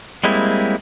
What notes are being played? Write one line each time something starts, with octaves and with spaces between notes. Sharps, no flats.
G3 G#3 A#3 C4 E4